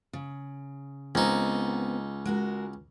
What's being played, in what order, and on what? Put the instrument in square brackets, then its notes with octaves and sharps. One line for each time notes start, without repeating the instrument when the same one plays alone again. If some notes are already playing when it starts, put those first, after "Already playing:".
[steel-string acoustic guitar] C#3
[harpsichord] C#2 D#4 [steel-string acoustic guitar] B3 C4 A#4
[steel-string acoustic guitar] G#3 F#4 A#4